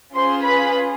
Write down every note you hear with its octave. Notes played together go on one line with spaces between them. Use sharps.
C#4 F4 G#4 C5 C6
B4 B5